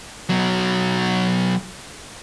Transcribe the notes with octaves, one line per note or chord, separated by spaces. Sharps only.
B2 F#3